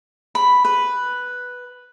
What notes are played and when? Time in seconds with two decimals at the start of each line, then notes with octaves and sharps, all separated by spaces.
0.35 B5
0.65 B4